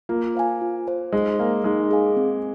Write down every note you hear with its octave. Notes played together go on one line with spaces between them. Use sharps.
A#3 F4
C5 F5 G#5
F4
C5 F5 G#5
G#3 D#4
A#3 G#4 F5 G#5
G#3 D#4
G#4 F5 G#5
C4